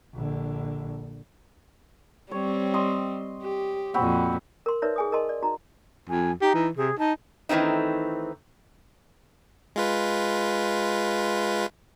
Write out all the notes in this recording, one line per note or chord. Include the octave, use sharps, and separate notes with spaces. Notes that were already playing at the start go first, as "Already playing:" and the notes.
A#1 D3
G3 C4 C#5
D#5 C6
G4
F2 A#2 C4 F#4 B5
A#4 C6
D#4 A#4 B4 C#5 D5 E5
G#4 G#5 D#6
A#4 D#5 A5 C6
D5
D#4 F#4 A#5
F2 G#5
D#4 G4
E3
C3 G#4
D#4 A5
D#3 E3 A3 C4 D#4
G#3 F4 B4